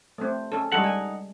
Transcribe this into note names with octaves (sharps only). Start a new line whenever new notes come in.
A3 C4
C#4 A4
G3 G#3 D#4 A4 F#5
G#5